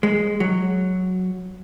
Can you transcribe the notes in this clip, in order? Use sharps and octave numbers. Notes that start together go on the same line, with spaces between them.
G#3
F#3